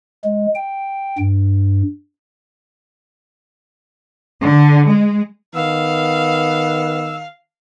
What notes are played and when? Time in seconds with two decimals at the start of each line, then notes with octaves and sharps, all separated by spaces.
0.24 G#3
0.55 G5
1.18 G2
4.41 D3
4.85 G#3
5.55 D#3 B3 F5 E6